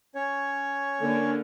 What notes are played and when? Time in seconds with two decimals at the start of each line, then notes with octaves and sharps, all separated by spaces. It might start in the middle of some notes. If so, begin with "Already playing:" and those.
0.15 C#4 C#5
1.02 D3 A#3